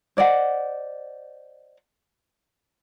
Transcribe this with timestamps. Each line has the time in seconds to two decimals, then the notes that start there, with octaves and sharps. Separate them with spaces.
0.17 C5 D5 D#5 F#5